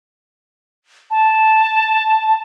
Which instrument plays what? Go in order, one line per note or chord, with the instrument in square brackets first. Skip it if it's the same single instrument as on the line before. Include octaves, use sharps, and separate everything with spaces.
[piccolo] A5